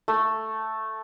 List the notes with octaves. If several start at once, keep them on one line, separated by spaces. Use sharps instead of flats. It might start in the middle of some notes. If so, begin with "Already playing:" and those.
A3